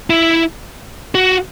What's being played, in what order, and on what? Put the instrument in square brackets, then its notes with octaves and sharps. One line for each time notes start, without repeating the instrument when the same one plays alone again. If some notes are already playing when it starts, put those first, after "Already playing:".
[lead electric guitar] E4
F#4